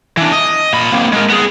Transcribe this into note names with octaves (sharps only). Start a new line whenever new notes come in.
E3 D4
D#5
A#2 B5
A#3 C4
G#3 A#4
B3 G#4